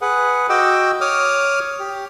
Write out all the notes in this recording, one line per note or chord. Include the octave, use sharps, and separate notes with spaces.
G#4 B4 F#5
F#4 D#5 G5 D6 E6
C#5 D6 D#6 F6
G4